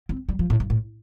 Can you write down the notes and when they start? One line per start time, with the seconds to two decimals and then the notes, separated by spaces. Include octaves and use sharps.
0.09 C4
0.29 G3
0.39 F3
0.50 A2
0.60 G2
0.70 A2